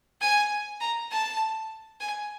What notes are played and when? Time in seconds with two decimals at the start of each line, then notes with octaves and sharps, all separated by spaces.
0.21 G#5
0.81 A#5
1.12 A5
2.01 G#5